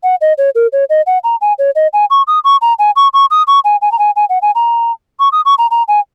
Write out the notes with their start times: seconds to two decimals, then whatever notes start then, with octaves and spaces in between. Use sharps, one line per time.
0.03 F#5
0.21 D#5
0.38 C#5
0.55 A#4
0.73 C#5
0.90 D#5
1.06 F#5
1.24 A#5
1.41 G#5
1.59 C#5
1.75 D#5
1.93 G#5
2.10 C#6
2.27 D#6
2.44 C#6
2.62 A#5
2.79 G#5
2.96 C#6
3.14 C#6
3.31 D#6
3.47 C#6
3.64 G#5
3.82 G#5
3.92 A#5
3.99 G#5
4.16 G#5
4.30 F#5
4.42 G#5
4.55 A#5
5.20 C#6
5.32 D#6
5.45 C#6
5.58 A#5
5.71 A#5
5.88 G#5